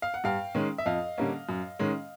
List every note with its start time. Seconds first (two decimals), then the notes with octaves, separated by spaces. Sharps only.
0.02 F5
0.14 F#5
0.24 G2 F5 G5
0.55 D#3 G#3 C#4
0.78 E5
0.86 F2 D#5 F5
1.18 D3 G3 A#3 C#4
1.49 F#2
1.79 D#3 G#3 C#4